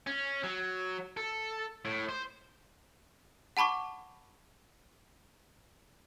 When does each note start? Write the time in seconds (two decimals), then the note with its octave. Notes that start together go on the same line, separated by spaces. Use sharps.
0.07 C#4
0.44 F#3
1.17 A4
1.85 A2
2.09 C5
3.57 F#5 A5 B5 C#6 D6